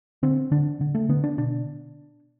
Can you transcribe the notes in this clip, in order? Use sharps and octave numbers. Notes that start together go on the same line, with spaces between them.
D3 C4
D3 D4
D3
A3
D3 B3
D4
B2 D4